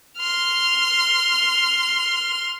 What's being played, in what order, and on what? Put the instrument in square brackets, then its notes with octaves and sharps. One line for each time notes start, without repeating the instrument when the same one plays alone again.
[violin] C6 F6